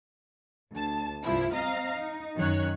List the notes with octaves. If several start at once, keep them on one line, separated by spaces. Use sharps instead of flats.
D2 A5
C2 G2 F3 E4
C4 D#5 F5 A#5
D#4
F#2 D#3 F#3 C#4 C#5 F#6